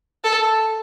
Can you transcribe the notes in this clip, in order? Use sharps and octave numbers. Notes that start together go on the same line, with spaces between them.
A4